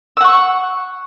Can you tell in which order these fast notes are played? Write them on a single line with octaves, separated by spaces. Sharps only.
E6 F#5 C#6